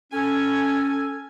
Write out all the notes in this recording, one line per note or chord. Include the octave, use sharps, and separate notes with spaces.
C#4 A4 G#5